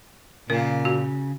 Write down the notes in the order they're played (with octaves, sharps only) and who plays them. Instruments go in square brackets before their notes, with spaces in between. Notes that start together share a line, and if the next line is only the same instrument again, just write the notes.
[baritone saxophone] A#2 [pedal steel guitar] C#3 [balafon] A#4
[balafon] F#4